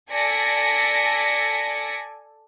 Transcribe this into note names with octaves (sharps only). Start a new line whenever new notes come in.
A4 D5 G#5 A#6 B6 C#7